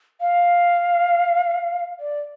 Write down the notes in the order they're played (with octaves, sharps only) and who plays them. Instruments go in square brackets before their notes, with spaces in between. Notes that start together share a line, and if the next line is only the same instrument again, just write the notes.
[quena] F5
D5